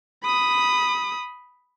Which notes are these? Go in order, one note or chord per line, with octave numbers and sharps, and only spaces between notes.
B5 D#6